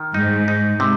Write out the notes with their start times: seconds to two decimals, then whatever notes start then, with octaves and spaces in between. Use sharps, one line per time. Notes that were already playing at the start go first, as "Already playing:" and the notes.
Already playing: D#3
0.14 G#2 D#4
0.48 D#4
0.80 C3